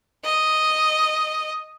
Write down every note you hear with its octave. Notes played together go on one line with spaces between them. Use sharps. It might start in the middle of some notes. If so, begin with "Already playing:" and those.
D#5